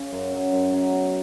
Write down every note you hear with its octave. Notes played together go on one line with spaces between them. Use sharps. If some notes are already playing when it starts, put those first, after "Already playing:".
Already playing: C#3 C#4
F#2
F#3 C#4
F#2
F#3 C#4
B2